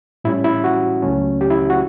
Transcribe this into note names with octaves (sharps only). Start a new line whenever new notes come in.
A2 G3 C#4 E4
E4
F#4
C#2 C#3 F#3 A3 C#4
G4
E4
F#4